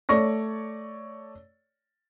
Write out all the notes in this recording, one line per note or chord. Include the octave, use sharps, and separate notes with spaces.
A3 C#5 D5 C#6 A#6